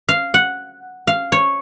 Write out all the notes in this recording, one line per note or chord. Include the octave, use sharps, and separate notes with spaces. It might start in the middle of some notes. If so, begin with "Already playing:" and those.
F5
F#5
F5
C#5